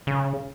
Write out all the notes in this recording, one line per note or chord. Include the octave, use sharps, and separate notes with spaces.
C#3